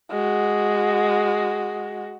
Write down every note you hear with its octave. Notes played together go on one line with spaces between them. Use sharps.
G#3 F#4